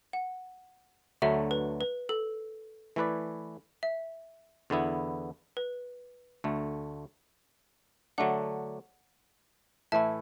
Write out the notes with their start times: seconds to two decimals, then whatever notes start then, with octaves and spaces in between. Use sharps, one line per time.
0.13 F#5
1.22 D2 D3 F#3 A3 E5
1.51 B4
1.81 B4
2.09 A4
2.96 E3 A3 E4 B4 D5
3.83 E5
4.70 E2 D3 B3 E4
5.57 B4
6.44 D2 D3 A3
8.18 D3 F#3 A3 D4 F#5
9.92 A2 E3 A3 E4 E5 A5